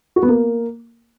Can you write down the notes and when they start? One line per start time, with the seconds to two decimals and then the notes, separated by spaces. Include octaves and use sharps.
0.16 F#4
0.23 B3
0.29 A#3